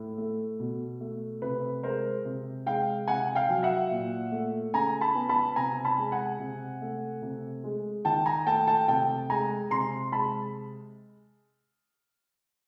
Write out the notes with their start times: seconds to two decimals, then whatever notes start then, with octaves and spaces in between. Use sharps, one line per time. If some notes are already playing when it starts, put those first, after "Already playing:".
Already playing: A2
0.18 A3
0.59 B2
1.01 A3
1.42 C3 B4
1.83 G#3 A#4 C5
2.25 C3
2.66 G#3 F5 G5
3.08 C3 F#5 G#5
3.35 F5 G5
3.49 F#3
3.63 E5 F#5
3.91 A#2
4.32 A3
4.74 C#3 G#5 A#5
5.01 A5 B5
5.15 B3
5.29 A5 B5
5.56 C3 G#5 A#5
5.85 A5 B5
5.98 G#3
6.12 F#5 G#5
6.39 C3
6.82 A3
7.22 C3
7.64 G#3
8.05 D#3 G5 A5
8.26 G#5 A#5
8.47 A3 G5 A5
8.67 G5 A5
8.88 C3 G5 A5
9.30 G#3 G#5 A#5
9.71 C3 A#5 C6
10.12 G#3 A5 B5